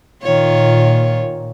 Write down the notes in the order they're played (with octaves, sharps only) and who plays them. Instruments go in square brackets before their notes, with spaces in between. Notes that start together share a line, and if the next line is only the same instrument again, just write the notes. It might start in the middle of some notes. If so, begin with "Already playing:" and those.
[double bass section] A#2 [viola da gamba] D#3 F4 C#5